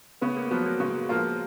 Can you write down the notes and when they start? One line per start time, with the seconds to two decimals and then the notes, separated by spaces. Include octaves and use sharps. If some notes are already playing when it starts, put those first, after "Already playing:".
0.21 C#3 B3
0.36 A#3
0.51 F3 F#3 B3
0.66 A#3
0.80 C#3 G#3
1.09 F3 A#3 F4